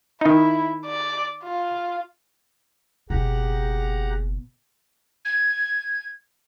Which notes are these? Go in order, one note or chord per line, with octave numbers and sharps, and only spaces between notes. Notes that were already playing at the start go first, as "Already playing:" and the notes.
D#3 D#4 E4
D5
F4
F#1 B2 G4 G#4 F#5 A#5
G#6